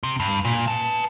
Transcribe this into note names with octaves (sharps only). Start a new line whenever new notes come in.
C3
G2
A#2
B4 A5